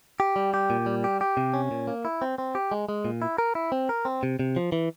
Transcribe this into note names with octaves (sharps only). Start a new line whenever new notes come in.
G4
G3
G4
A#2
G3
G4
G4
C3
C#4
A#2
A#3
E4
C4
C4
G4
G#3
G#3
A#2
E4
A#4
E4
C4
A#4
C4
C3
C3
F3
E3